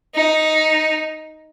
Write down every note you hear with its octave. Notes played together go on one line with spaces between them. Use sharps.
D#4